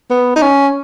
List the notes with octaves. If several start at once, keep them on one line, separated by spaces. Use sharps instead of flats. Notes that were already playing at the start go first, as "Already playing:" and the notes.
B3
D#4
C#4